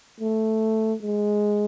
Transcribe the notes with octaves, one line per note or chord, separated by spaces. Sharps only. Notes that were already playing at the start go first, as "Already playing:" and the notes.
A3
G#3